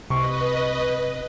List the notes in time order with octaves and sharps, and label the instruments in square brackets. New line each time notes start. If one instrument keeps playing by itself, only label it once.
[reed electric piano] C2 C#6 [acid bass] C3 [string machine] B4 D#5